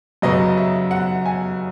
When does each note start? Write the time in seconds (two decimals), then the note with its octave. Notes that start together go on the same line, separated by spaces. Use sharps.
0.22 F#2 C#3 F#3 B3 D#5
0.57 E5
0.91 F#5
1.26 G#5